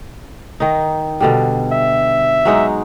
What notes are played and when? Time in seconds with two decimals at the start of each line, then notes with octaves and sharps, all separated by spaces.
0.60 D#3 D#4
1.21 B2 D3 G3
1.72 E5
2.45 F#3 G#3 D#4